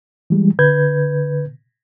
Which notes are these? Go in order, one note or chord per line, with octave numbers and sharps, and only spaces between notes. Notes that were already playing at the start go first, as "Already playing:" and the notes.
E3 G3 G#3
D3 B4 G6 G#6